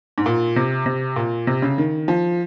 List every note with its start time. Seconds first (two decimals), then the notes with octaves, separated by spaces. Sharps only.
0.18 G#2
0.26 A#2
0.56 C3
0.86 C3
1.16 A#2
1.47 C3
1.62 C#3
1.78 D#3
2.08 F3